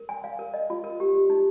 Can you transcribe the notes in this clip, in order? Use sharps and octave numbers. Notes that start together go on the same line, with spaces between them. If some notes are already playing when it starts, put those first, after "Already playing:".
Already playing: A#4
G#5
F5
A#4
D#5
F4
A#4
G4
G4
D#4